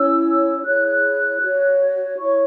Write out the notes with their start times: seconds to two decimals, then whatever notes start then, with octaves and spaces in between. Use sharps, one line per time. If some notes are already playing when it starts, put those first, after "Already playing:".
Already playing: C#4 E4 C#5 E6
0.65 E4 G#4 C#5 F#6
0.85 F#6
1.42 F#4 C#5
2.19 E4 C#5 C#6